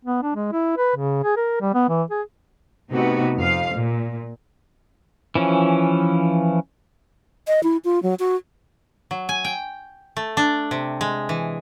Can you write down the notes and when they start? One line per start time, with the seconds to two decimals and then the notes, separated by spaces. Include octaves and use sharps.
0.05 B3
0.23 D4
0.35 G#3
0.52 E4
0.78 B4
0.96 C#3
1.24 G#4
1.36 A#4
1.61 G3
1.75 B3
1.89 E3
2.11 G#4
2.91 C3 A3 B3 D#4 F#4
3.37 F2 F5
3.75 A#2
5.35 E3 F3 C#4
7.47 D#5
7.63 E4
7.84 F4
8.03 F#3
8.19 F#4
9.11 F#3
9.29 G#5
9.45 G5
10.17 A3
10.37 D4
10.71 C3
11.01 G#3
11.29 E3